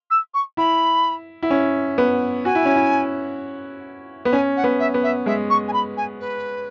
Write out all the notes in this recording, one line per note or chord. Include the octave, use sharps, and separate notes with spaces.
E6
C#6
E4 B5
E4
C#4
B3
F#4 G#5
E4
C#4
E4
B3
C#4 G#5
F#5
B3
E5
B3
E5
G#3 E5
C#6
G#5
B5
G#5
B4